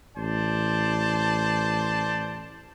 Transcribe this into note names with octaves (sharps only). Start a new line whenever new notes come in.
A1 C5 D5 A5